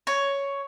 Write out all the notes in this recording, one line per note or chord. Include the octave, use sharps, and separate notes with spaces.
C#5